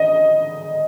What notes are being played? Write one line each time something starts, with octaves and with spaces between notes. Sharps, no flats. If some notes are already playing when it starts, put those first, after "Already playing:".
Already playing: D#5